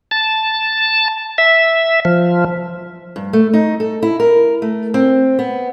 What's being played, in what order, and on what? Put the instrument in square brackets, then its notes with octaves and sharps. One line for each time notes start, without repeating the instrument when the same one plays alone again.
[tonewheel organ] A5
E5
F3
[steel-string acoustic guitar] G2
A3
D#4
A4
E4
A#4
A3
C4
B3